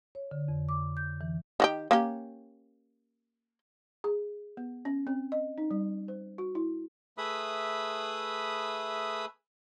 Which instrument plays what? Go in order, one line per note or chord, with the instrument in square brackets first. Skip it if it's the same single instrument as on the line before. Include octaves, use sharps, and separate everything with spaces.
[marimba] C#5
D3
F2
D6
G6
E3
[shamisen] D#3 F#4 G4
A#3 C#4 G4
[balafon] G#4
B3
C#4
C4
D#5
D#4
G3
C5
F#4
E4
[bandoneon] A3 G#4 B4 E5 B5 D#6